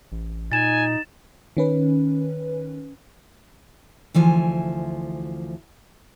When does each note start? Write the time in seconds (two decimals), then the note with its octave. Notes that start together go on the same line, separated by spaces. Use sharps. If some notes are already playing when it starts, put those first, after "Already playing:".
0.12 A1
0.52 A#2 D#4 G#5 A6 E7
1.57 D#3 C#4 B4
4.14 D2 E3 F3 G#5